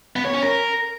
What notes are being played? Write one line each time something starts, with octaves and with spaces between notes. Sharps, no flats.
B3
C#5
C#4
A#4